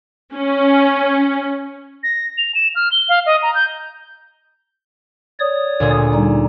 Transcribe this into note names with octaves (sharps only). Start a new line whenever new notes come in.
C#4
A#6
F7
E7
F6
G7
F5
D#5
A#5
G6
C#5 D5 D#6
D2 A#2 G#4
G3 D#4